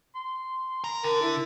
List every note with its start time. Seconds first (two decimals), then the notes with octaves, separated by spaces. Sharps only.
0.15 C6
0.84 A#4
1.04 D3 A#4
1.22 E4 E5